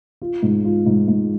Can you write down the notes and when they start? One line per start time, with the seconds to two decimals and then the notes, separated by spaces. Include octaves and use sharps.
0.22 F4
0.43 G#2
0.65 F4
0.86 G#2
1.08 G#2